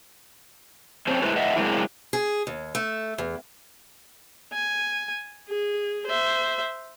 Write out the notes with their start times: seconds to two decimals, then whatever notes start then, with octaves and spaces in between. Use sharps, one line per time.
1.07 C4 C#4 A4 C5
1.22 G#3 A3 E4 A4 B4 C5
1.36 A2 D#5 E5 F#5
1.56 F#3 G#3 A#3 C4 D4 E4
2.13 G#4
2.47 D#2
2.75 A3
3.18 E2
4.53 G#5
5.48 G#4
6.07 C5 E5